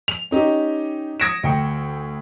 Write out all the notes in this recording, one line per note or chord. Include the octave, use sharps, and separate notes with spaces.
F7
C#4 D#4 G4
D#6 G#6 A#6 C#7 D7 E7
D2 G5 C#7